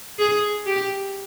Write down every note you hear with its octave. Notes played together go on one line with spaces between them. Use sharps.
G#4
G4